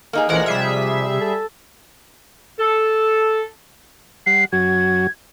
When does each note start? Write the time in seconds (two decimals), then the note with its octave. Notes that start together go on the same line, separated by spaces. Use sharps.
0.13 A#3 D#4 G#4
0.29 A#1 E3 F3 G#3 D4 A#4 F#5
0.46 C3 G3 G#4 E5
1.21 A4
2.59 A4
4.26 G3 F#5 C7
4.53 F#2 F#3 F#4 G#6